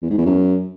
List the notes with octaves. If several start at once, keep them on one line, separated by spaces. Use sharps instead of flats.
E2
G#2
E2
F#2